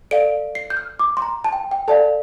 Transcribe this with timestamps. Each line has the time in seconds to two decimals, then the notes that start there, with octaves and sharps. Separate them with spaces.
0.11 A4 D5 F5 D7
0.55 C7
0.70 G6
0.77 F6
0.99 D6
1.17 C6
1.22 A#5
1.44 A5
1.53 G5
1.71 G5
1.88 A4 D5 F5 A5